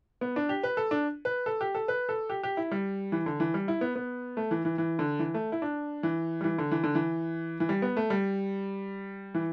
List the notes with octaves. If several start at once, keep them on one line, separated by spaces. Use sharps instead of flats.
B3
D4
G4
B4
A4
D4
B4
A4
G4
A4
B4
A4
G4
G4
E4
G3
E3
D3
E3
G3
E4
B3
B3
A3
E3
E3
E3
D3
E3
A3
E4
D4
E3
G3
E3
D3
E3
D3
E3
E3
G3
B3
A3
G3
E3